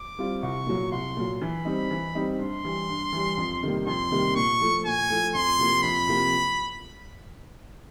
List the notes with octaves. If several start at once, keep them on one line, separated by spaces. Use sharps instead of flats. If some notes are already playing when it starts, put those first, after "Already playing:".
Already playing: D6
G3 C4 F4
C2 C#6
A#2 F#3
C2 C6
A#2 F#3
E3 B5
G3 C4 D#4
E3
G3 C4 D#4
G2 C6
E3 G3
G2
E3 G3
F2
C3 D#3 G3 A#3
F2 C6
C3 D#3 G3 A#3
A#2 C#6
F3 A3
A#2 G#5
F3 A3
F2 C6
C3 F3 A#3
F2 B5
C3 F3 A#3